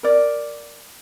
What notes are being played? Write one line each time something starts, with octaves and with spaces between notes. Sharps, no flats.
A#4 D5